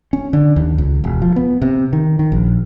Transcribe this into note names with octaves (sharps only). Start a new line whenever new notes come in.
C#4
D3
D#2
C#2
E1
F3
B3
C3
D#3
D#3
A#1